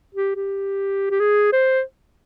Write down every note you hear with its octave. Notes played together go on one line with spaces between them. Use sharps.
G4
G4
G4
G#4
C5